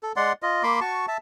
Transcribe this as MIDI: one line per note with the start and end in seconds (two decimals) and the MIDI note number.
0.03 0.12 69
0.16 0.33 56
0.16 0.33 74
0.16 0.33 78
0.16 0.33 84
0.42 0.63 65
0.42 0.63 75
0.63 0.80 58
0.63 0.80 83
0.63 0.80 84
0.63 0.80 86
0.81 1.06 66
0.81 1.06 81
0.81 1.06 85
1.08 1.17 76
1.08 1.17 81